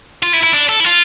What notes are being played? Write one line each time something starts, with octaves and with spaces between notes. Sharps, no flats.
F4
E4
E4
D4
A4
E4
F4